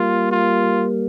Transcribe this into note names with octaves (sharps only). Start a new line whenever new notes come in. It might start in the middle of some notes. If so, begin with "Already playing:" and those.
Already playing: G3 A#3 F4
F4